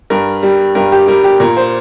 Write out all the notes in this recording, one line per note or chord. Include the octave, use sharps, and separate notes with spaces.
G2 A#4
G3
G2 A#4
G4
G3 A#4
G4
A#2 A#4
C5